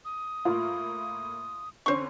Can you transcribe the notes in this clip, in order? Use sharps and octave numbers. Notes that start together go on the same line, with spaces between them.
D#6
A2 A#3 F4
F2 D3 C#4 C5 C#6